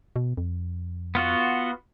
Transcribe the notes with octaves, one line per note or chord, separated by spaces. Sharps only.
B2
F2
B3 F4 F#4